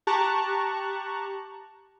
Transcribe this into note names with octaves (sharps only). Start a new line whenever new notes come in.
G4 A5 A#5 C#6 F#6